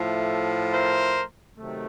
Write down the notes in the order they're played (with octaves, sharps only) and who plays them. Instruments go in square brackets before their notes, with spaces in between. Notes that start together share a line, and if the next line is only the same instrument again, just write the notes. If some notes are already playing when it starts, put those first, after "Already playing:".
Already playing: [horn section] A2 F3 A3
A#4 C5
C3 D#3 F#3 A3